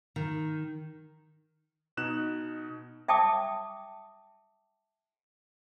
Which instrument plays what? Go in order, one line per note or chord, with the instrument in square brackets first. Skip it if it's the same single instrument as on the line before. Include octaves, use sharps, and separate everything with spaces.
[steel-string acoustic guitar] D#3
[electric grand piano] B2 D#4 F#6 E7
[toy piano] E5 G5 A5 D6 D#6